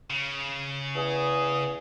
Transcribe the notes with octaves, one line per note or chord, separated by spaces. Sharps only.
C#3
E2 G#4